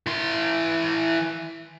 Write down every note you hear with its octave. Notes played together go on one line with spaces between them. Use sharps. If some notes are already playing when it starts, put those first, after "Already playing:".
E3 C6